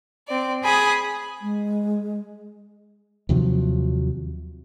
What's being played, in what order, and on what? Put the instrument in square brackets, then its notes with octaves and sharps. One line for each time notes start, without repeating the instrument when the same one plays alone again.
[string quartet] C4 D5
G#4 G#5 B5 D#6
[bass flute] G#3
[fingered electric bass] D#2 C3 F3 F#3